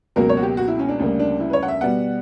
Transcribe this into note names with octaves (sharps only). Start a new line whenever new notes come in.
C#2 B2 F#3 A#3 A#4
C#5
F#4
G4
F#4
E4
C#4
D4
D2 C#3 G3 A#3
D4
E4
B4
C#5
F#5
E5
B2 G3 B3 F#5